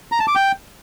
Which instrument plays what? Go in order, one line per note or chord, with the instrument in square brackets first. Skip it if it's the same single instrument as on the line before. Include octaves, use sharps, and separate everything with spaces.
[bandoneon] A#5
A5
D6
G5